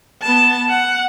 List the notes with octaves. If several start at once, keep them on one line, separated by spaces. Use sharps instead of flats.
B3 A5
F#5